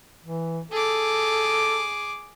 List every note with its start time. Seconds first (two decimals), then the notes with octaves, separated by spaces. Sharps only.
0.25 E3
0.72 G#4 A4 D6